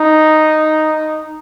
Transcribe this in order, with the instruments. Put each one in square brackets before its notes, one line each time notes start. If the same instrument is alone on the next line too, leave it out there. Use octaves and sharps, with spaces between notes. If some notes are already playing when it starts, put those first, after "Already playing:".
Already playing: [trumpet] D#4